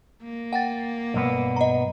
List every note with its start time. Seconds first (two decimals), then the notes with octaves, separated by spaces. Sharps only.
0.23 A#3
0.53 F#5 G5 A6
1.14 B1 G2 B3
1.56 D#5 A#5